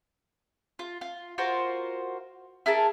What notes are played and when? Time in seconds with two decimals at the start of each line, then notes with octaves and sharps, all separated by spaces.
0.79 F4
1.01 F4
1.38 F4 F#4 A#4 C5
2.66 E4 G#4 A#4 A5